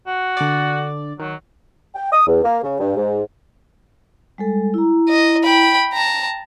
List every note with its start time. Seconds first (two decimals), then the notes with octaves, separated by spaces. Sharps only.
0.07 F#4
0.37 D3 D5
1.19 D#3 F#3
1.95 G5
2.12 D#6
2.27 E2
2.44 A#3
2.63 C#3
2.79 G2
2.96 G#2
4.38 G3 G#3 A4
4.74 E4 A#5
5.09 D#5
5.43 G5 B5
5.93 G5 A5 A#5